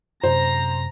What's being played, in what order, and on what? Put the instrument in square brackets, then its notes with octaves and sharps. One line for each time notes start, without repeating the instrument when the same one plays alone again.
[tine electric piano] F#2 C3 [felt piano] C5 [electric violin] A#5 A#6